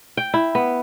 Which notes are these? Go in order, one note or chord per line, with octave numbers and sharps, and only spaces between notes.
G5
E4
B3